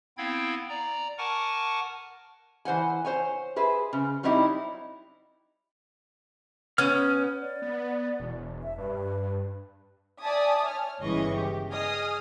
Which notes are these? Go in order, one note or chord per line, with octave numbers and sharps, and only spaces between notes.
B3 C4 E4 F5 G5 G#6
D5 A#5
A#4 F#5 G#5 A5 C#6 D6
E3 C5 F#5 G#5
C5 C#5 G#5
G#4 B4 C5 E5
C#3
F#3 G3 C4 D#4 E4 G4
B3 C#4 F6
D5
B3
E1
E5
G2 B4
D5 E5 G#5 A5 D#6
C#5 F6
G1 C#3 E3 G#3 D#5 C#6
G4
G#4 D#5 D#6 F6